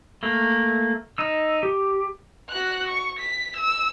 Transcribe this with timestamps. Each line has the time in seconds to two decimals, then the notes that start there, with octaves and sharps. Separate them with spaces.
0.23 A3 A#3
1.18 D#4 E6
1.63 G4
2.50 F#4 F#6
2.88 C#6
3.19 B6
3.56 E6